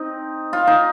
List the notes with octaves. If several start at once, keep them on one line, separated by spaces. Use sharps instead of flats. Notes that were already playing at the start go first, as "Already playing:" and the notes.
Already playing: C4 D#4
F4
D#4